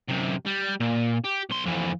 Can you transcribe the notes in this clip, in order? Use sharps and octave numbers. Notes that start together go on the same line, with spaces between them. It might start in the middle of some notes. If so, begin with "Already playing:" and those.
F#2 C3
G3
A#2
G4
B1 C6
F2 E3